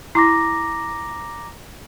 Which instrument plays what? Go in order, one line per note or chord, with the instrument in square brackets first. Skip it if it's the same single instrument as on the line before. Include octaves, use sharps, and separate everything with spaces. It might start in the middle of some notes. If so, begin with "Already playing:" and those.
[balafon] E4 [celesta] A#5 D6 A#6